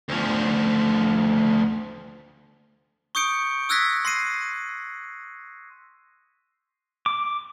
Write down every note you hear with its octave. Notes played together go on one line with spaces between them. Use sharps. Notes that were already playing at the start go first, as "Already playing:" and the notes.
D2 F3
C#6 D#6 G6 C#7 D7
D#6 E6 F#6 G#6 A#6 B6
C6 A#6 C7 D#7
D6